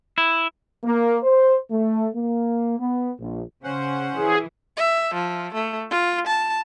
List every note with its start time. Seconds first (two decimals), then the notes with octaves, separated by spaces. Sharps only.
0.18 E4
0.84 A#3
1.23 C5
1.71 A3
2.15 A#3
2.79 B3
3.19 A#1
3.64 C#3 C#4 C5 F#5
4.17 E3 G#4
4.77 E5
5.14 F3
5.54 A3
5.91 F4
6.27 A5